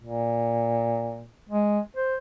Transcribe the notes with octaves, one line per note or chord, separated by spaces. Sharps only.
A#2
G#3
C5